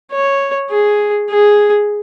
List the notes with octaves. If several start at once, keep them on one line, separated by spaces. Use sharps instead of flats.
C#5
G#4
G#4